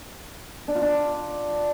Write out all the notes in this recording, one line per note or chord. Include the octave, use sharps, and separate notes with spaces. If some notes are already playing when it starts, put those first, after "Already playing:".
D4
F4
D4